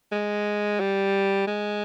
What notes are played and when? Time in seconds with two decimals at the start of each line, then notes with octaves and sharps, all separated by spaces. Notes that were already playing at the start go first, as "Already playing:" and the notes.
0.12 G#3
0.80 G3
1.48 G#3